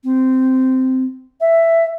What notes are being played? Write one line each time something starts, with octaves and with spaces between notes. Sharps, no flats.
C4
E5